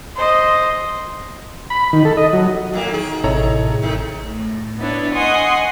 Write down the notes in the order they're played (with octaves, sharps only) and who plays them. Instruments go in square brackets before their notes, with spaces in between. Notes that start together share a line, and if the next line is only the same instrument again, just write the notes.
[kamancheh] C5 D#5
[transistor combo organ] B5
D#3
A4
D#5
F#3
[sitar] A2 A#3
D#3 G#4
[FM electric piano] A1 C3 E4 [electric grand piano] A4 C#5 A#5
[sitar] D#3 A3
[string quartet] A2
B3 D4 E4 B4 C#5
D#5 F#5 G#5 C6 C#6 D#6